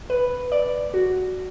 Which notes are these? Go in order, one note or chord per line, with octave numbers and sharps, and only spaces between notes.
B4
D5
F#4